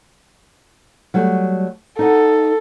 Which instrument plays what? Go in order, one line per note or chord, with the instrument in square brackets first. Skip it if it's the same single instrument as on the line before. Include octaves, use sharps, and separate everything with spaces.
[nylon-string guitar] F#3 G3 A3
[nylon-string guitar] D#4 D#5 F#5 [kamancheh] A4